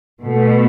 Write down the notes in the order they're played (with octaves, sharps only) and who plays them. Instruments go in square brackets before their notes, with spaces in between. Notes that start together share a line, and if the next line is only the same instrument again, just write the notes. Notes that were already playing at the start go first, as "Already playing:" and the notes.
[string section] B2 A3